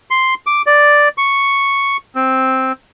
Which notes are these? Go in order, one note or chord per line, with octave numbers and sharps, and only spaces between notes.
C6
D6
D5
C#6
C4